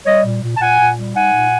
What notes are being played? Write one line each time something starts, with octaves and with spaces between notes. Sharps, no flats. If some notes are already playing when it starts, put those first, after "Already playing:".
G3 C#5 D#5
A#2
A#2
A5
A#2 F#5 G#5
A#2
G3
D#4 F#5 G#5
A#2